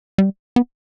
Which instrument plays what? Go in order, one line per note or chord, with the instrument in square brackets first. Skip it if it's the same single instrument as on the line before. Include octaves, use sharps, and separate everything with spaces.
[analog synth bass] G3
B3